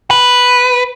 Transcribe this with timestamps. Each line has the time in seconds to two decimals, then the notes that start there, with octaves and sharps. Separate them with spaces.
0.10 B4